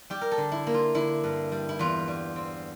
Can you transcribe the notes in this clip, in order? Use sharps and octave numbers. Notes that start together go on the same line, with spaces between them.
G3 G4
A#4
A4
D3
E4
A#3
F4
D3 E4
G2
G3
E4
E2 F4
G3
C4